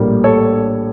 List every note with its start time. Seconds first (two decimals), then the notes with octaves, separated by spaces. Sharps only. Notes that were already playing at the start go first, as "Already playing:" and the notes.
Already playing: A#1 A2 G3 A#3
0.24 A4 C#5